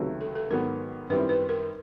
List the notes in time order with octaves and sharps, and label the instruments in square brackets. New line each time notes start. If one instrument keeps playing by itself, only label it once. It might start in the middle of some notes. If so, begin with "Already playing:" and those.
Already playing: [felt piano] C#2 C3 D#3 F#3 A3
[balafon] A4
A4
[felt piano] G#2 D#3 F#3 B3 [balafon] A#4
[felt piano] F#2 D#3 G3 C4 E4 [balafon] B4
[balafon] B4
A#4